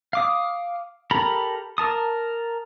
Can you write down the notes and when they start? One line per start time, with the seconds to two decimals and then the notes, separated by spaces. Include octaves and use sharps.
0.13 F5 D6 D#6
1.11 G4 A4 A#4 A#5 B5
1.78 A#4 A5 D#6